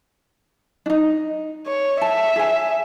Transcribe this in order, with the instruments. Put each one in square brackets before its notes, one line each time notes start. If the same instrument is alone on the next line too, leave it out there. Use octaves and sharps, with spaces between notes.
[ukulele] D4 D#4
[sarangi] C#5
[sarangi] E5 [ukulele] A5
[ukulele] G#4 G#5